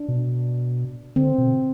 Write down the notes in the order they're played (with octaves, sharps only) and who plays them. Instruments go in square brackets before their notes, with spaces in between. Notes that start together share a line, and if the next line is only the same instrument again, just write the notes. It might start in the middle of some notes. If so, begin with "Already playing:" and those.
Already playing: [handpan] D4
[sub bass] B2
[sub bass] D3 [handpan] C4
[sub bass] B2